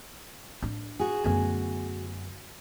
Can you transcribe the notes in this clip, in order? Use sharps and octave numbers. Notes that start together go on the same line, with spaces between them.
A2 D4
F#4 G#4
F#2 D3 A3 B3 G#5